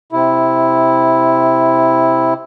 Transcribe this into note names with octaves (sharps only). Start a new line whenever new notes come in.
C3 E4